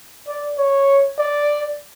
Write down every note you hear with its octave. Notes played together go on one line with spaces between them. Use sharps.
D5
C#5
D5